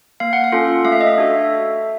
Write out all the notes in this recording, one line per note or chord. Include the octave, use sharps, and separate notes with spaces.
A#3 F5
F#5
F5
C#4 F4 A4
A3 F5
E5
D#5
E5
D4 F#4 A4